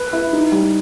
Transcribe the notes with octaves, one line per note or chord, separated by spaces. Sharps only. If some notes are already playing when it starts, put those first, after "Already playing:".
Already playing: B4
E4
D#4
G3